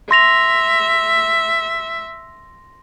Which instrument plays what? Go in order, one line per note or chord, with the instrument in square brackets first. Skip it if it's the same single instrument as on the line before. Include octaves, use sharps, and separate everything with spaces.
[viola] E5 [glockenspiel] C6 A#6 F7